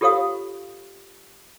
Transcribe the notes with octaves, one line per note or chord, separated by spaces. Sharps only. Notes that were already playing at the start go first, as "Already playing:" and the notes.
F4 G4 A4 C#5 F5 D#6